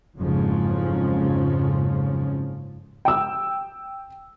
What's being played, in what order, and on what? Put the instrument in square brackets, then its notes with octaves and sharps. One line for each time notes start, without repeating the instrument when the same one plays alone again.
[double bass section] F#1 F2 G#2 C#3 F3 C#4
[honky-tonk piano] G5 E6